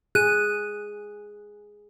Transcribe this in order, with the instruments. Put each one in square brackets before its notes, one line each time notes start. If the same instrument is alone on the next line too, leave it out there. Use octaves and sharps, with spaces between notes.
[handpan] G#4 [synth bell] F#6 D#7